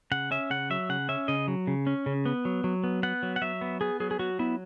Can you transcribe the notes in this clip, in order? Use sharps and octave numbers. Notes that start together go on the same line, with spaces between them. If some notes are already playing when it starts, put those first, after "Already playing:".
C#3 F#5
C#4 E5
C#3 F#5
F#3 E5
C#3 F#5
C#4 E5
C#3 D#5
F#3
C#3
C#4
C#3
B3
F#3
F#3
B3
B3 F#5
F#3
F#5
F#3 E5
B3
B3 G#4
F#3 G#4
G#4
F#3 F#4
B3 E4